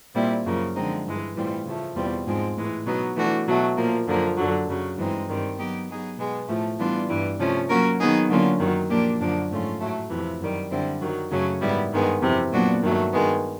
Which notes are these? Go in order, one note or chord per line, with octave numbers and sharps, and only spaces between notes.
A#2 G3 C4 E4
F#2 C#3 F3 A#3
D3 F3 G#3 C4 D#4
G2 E3 G#3
A2 E3 G3 C4 F4
C#3 F3 A3
E2 B2 G3 C4 F4
G#2 F3 G#3 C4
A2 E3 G#3
B2 F#3 B3 D#4
E3 A3 D4 F#4
B2 F#3 A3
A#2 F3 A#3
F#2 D3 F3 A#3
F#2 D3 F#3
F#2 C#3 F#3
G2 E3 G#3 C4 D#4
G2 D#3 G3 C4
F#3 B3 D#4 G4
F#3 B3 D#4 G#4
B2 G#3 B3
A2 F3 A3
E3 G3 B3 D4 F4
G2 E3 G3
C3 F3 A3 C#4
F#3 A#3 C#4 F#4 A#4
D#3 F#3 B3 D#4 G#4
D3 F#3 A#3 C#4 F4
F#2 D#3 F#3
A#2 F3 A#3 D4 G4
F#2 D3 F3 A#3 D4
G#2 F3 A3 C#4 F4
A2 F#3 A3
F2 C3 E3
F#2 D#3 G3
F#2 D3 G3 C4 E4
F#2 D#3 F#3
F#2 C#3 F#3 A3 C#4
G#2 D#3 G3 B3 E4
G2 D#3 G#3 B3
F2 C3 E3
A#2 F#3 B3 D4 F#4
G2 D#3 F#3 A3
G2 D#3 G#3 B3